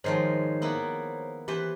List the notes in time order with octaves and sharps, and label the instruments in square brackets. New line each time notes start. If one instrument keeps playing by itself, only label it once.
[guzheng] G#2 D#3 F3 [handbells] C5 C#5 C7
[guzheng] A#3 B3 E4
[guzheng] E3 B4 C5 [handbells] G4